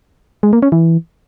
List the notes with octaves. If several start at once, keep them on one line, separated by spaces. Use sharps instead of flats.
G#3
A#3
C#4
E3